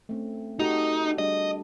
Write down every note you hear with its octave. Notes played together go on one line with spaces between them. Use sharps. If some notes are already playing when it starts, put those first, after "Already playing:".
A3 C4 C#4
D#4 F#4 G4 A4
G3 D4 G#4 D#5